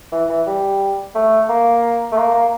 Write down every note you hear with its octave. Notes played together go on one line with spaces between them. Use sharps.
E3
E3
G3
A3
A#3
A3
A#3
A#3